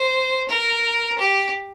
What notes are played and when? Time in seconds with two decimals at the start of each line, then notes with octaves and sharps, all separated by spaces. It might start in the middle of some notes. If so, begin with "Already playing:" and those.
Already playing: C5
0.49 A#4
1.18 G4